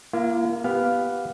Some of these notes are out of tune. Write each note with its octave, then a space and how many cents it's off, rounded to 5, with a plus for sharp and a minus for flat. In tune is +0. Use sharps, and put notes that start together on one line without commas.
A#3 +15 F4 -45
B3 +0 G4 +0 F5 +0